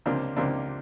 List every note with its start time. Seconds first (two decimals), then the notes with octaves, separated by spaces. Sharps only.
0.06 C#2 C3 F3 A#3 D4
0.36 C#2 C3 F3 A#3 D4